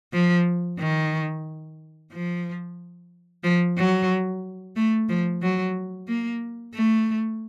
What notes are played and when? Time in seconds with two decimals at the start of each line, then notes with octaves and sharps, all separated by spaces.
0.13 F3
0.79 D#3
2.12 F3
3.44 F3
3.78 F#3
4.76 A3
5.09 F3
5.42 F#3
6.08 A#3
6.75 A3